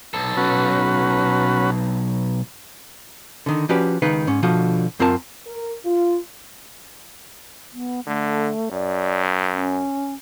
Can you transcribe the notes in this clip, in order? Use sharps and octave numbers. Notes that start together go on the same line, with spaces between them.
B1 A4
C#4 F#4 B4
D3 D#3
F3 C#4 F#4 G4 B4 D5
C#2 D#3 D#4 B4 F5
G#2 C#4
B2 D3 F3 F#4
F#2 C4 F4 A#4 A5
A#4
F4
B3
D3 A3
F#2 D5
C#4